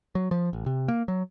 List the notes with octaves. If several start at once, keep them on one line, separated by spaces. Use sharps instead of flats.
F#3
F3
A1
C3
A#3
F#3